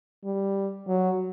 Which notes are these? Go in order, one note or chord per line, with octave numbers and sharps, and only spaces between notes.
G3
F#3